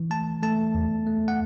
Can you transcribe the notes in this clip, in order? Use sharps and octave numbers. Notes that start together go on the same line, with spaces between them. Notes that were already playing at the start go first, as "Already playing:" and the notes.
Already playing: E3
A3 A5
A3 A5
E2
A3
F#5